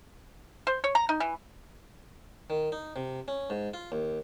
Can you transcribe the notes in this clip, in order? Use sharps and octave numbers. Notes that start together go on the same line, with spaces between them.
C5
C#5
A#5
D#4
E3
D#3
D#4
C3
C#4
G#2
F4
D#2